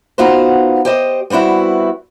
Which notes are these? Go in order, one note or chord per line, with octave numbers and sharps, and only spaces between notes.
B3 D#4 F4 F#4 C5
G4 C5 D#5
G3 B3 C4 E4 F#4